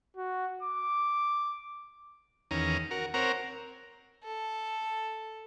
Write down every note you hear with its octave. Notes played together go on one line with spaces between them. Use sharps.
F#4
D6
E2 D#3 C#4 A#5
F#4 A#4
C4 A#4 C#5 F#5 A#5
A4